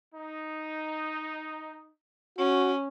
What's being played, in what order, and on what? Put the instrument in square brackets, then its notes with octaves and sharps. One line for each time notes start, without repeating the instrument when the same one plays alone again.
[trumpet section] D#4
[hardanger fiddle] C#4 [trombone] F#4